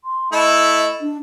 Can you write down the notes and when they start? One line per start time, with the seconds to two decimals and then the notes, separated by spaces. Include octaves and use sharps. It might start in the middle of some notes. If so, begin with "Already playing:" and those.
0.04 C6
0.32 A3 E4 D#5
1.01 D4